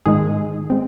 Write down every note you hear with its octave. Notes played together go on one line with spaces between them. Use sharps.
G#2 D#3 G#3 D#4 G#4
G#3 C4